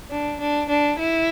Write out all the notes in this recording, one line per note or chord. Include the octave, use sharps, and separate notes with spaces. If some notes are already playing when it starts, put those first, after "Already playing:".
D4
D4
D4
E4